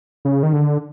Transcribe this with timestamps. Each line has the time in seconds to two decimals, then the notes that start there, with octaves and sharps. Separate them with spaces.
0.25 C#3
0.43 D#3
0.53 D3